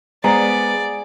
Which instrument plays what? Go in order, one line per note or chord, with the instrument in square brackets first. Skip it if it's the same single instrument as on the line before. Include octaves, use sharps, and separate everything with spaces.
[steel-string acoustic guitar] G#3 [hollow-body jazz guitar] B3 C5 A#5 [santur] G#4 [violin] D5